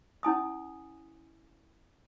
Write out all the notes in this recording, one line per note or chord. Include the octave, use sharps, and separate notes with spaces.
C#4 E4 G#5 D#6